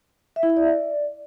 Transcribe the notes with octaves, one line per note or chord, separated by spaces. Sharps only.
E5
E4
E5
D5